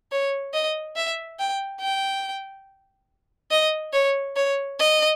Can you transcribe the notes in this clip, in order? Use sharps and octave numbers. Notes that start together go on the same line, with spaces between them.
C#5
D#5
E5
G5
G5
D#5
C#5
C#5
D#5